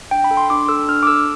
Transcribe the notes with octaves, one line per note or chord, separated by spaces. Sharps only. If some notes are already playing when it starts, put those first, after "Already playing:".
D4 G5
B5
A4
C6
D4 D6
A4 E6
D4 F6
D6
A4 E6